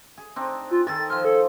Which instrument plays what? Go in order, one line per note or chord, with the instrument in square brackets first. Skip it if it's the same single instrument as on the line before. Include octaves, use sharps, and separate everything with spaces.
[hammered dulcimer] G#4
C4 D4 D#4
[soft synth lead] F4
[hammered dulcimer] D#3 G#4 A4 [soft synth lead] A6
[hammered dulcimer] F3 C5 [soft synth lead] F6
[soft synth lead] A4